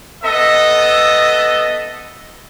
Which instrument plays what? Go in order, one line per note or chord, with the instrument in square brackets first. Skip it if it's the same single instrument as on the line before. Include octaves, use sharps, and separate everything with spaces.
[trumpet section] B3 A4 D#5 E5